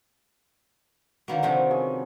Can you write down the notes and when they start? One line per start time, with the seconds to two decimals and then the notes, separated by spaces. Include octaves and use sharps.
1.28 D3 D#3 A#3 F#4 B4 C#5
1.43 C3 D#3 F3 A3
1.70 A#3 C#4 G#4